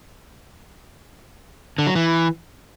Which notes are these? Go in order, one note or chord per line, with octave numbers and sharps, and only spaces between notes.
D3
F#3
E3